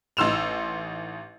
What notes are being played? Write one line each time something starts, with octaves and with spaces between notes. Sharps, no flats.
A1 D#4 C6 E6 E7 F7